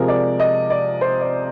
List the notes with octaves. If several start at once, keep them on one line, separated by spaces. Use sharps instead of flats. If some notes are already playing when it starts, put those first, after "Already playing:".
Already playing: C3 F3 G#3 A#4
D5
D#5
D5
C5
D5